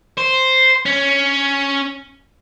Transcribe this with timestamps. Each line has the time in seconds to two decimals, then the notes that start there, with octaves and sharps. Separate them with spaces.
0.18 C5
0.86 C#4